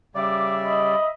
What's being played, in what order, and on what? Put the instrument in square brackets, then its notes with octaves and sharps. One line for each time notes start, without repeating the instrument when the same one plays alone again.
[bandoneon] C#3 G3 D5 [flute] E5 [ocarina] D6
[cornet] D#5 [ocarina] B5